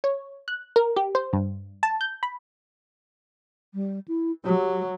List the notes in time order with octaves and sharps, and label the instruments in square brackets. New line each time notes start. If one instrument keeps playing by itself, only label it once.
[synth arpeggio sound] C#5
F#6
A#4
G4
C5
G2
A5
G6
B5
[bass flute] G3
E4
[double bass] F#3 [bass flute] G4